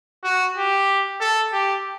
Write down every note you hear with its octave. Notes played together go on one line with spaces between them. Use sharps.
F#4
G4
A4
G4